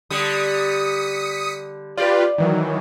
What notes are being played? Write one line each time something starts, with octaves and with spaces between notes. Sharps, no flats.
D3 G3 D#6 B6 C#7
F4 G4 B4 D5
D#3 E3 F#3